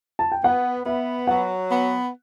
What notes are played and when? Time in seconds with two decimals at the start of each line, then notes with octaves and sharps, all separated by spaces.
0.19 A5
0.32 G5
0.44 B3 F#5
0.86 B3 E5
1.27 F#3 F#5
1.70 B3